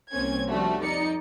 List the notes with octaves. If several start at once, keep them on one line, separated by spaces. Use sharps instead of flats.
C2 A#3 C4 C#4 G#6
F3 G3 A3 D4 F#4
F2 D#4 D5 C#7